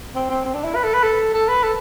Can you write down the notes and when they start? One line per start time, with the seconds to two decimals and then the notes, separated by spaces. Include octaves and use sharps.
0.15 C4
0.30 C4
0.45 C4
0.54 D4
0.64 E4
0.75 B4
0.84 A4
0.94 B4
1.03 A4
1.34 A4
1.49 B4
1.63 A4